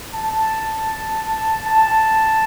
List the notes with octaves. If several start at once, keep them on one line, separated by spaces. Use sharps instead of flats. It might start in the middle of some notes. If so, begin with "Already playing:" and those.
A5
A5